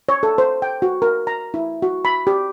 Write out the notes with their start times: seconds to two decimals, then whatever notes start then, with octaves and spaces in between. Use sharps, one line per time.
0.09 C#5
0.23 A4
0.38 C5
0.62 G5
0.82 F#4
1.02 A#4
1.27 A#5
1.54 E4
1.82 F#4
2.05 B5
2.27 G4